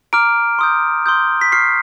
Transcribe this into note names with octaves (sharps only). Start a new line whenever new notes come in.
A#5 D6 F6 D7
C6 D#6 G6
C6 D#6 G6
B6
C#6 F6 C7